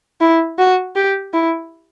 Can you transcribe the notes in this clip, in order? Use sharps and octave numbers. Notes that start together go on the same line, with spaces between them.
E4
F#4
G4
E4